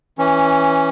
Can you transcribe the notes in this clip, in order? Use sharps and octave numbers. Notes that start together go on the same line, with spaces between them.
E3 C#4